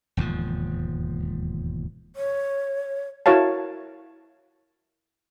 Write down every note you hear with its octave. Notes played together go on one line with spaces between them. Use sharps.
E1 D#2 G#2 F3
C#5
E4 F#4 A#4 C#5 F5 A5